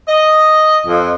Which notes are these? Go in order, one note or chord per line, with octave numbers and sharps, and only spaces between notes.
D#5
F2